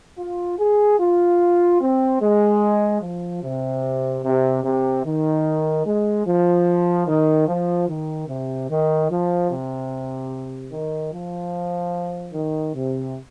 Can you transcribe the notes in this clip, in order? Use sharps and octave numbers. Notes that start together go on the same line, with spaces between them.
F4
G#4
F4
C4
G#3
F3
C3
C3
C3
D#3
G#3
F3
D#3
F3
D#3
C3
D#3
F3
C3
D#3
F3
D#3
C3